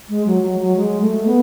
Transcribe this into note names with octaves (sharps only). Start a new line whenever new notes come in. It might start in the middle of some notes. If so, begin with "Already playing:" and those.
G#3
F#3
F#3
F#3
G#3
A3
B3